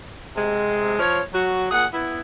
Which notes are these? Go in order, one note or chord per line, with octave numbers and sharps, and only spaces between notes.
C3 G#3
F3 C#5
F#3 F#4
A#2 G#4 F#5
B3 E4